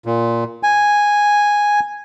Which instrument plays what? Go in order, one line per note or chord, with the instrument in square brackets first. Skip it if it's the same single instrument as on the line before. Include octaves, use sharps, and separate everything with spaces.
[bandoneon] A#2
G#5